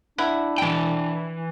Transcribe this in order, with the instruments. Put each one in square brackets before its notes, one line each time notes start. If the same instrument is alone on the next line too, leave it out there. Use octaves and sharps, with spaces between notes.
[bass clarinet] D4 [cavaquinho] E4 F#5
[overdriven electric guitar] E3 G5